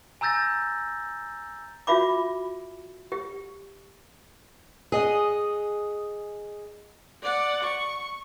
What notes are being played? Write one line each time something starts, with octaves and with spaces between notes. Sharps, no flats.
G#5 A#5 E6 G6 A6 A#6
F4 F#4 E5 B5 D6
G4
G#4 D#5 F#5
D5 F#5
C#6